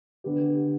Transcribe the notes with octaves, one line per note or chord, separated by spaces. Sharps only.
D3 B3 G4